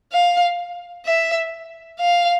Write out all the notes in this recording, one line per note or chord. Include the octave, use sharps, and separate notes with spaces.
F5
E5
F5